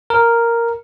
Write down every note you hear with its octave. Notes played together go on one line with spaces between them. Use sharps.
A#4